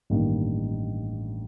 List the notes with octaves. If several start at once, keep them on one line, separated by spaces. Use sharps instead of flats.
A1 G2 D#3 A#3